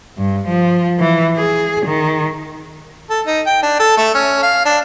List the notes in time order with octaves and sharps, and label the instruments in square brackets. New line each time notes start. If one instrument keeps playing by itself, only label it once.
[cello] G2
F3
E3
G#4
D#3
[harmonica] A4
D#4
G5
D4
A4
A3
C#4
F5
D4